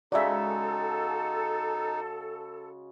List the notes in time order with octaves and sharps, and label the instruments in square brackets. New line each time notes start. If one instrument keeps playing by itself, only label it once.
[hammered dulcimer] C#3 G#3 F#4 [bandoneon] D#4 [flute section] A4 [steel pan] D5 E5